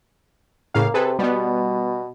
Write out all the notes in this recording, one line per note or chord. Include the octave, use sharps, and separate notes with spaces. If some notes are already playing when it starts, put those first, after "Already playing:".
A2 C#3 A#3 F5
C3 G#4 A4 B4
B2 G3 B3